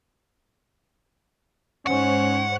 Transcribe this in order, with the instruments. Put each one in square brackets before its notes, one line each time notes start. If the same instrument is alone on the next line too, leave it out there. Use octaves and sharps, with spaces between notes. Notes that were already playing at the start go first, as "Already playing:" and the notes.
[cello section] G#2 C5 C#5 [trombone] C#4 [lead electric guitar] F#5